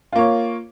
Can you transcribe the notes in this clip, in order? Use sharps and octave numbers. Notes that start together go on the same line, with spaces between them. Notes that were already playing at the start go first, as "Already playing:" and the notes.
A#3 F4 C#5